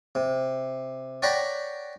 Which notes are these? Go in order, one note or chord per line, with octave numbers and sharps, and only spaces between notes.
C3
C#5 D5 F#5 G5 A#5 B5